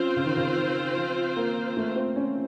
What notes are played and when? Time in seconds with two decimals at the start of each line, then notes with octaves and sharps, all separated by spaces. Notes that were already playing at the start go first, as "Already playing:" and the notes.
Already playing: F3 C4 C#4 F4 C5
0.16 C#3
0.26 D#3
0.37 C#3
0.56 D#3
0.96 F3
1.37 A#3
1.77 A3
1.96 C4
2.16 C#4